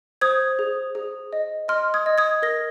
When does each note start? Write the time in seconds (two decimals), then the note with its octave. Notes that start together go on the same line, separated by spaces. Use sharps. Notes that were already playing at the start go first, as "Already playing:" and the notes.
0.21 C5 D#6 G#6
0.59 G#4
0.95 G#4
1.33 D#5
1.68 D#5 C6 F6
1.94 D#6 G#6
2.06 D#5
2.18 D#6 G#6
2.42 A#4 A#6